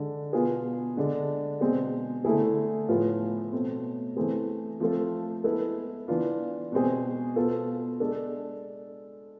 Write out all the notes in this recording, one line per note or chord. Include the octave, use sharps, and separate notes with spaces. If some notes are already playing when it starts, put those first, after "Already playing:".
Already playing: D3 G#3 D4
B2 B3 F4 G#4
D3 G#3 D4
B2 G#3 C4 G#4
D3 A3 E4 G#4
A2 F3 B3 F4 G#4
B2 A3 C4
E3 A3 C4 G#4
F3 A3 C4 F4 A4
G#3 B3 E4 A4
E3 B3 D4 F4
B2 G#3 C4 G#4
B2 B3 F4 A4
G#3 D4 A4